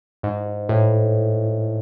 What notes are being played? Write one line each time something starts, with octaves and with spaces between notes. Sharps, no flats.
G#2
A2